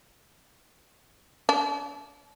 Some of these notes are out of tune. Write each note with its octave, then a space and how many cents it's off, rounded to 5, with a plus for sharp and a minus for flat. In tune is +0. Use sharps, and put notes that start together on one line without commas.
D4 -45